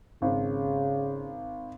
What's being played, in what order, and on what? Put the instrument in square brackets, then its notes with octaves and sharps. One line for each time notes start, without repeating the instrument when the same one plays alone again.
[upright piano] G#1 [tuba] C#3